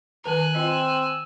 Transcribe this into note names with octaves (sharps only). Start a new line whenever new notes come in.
D#3 B4 G#5 A#5 F#6
C4 F4 D#5 E6